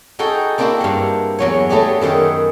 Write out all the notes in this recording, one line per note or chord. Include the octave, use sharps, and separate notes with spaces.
D#4 F#4 G#4 A4 G5
A#3 C4 D4 E4 F#4 G4
G2 F#5
E2 F#3 C#5
F#3 A3 B3 D4 G4 G#4
F#2 D#3 G#4 E5 F#5